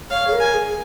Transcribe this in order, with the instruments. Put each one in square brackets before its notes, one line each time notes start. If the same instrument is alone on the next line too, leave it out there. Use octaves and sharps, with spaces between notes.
[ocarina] C#5 [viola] F5
[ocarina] G#4
A#4
[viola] G#5
[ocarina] G#4